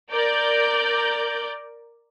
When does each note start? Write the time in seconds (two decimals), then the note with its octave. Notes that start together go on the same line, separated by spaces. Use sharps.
0.11 A#4 D5 G6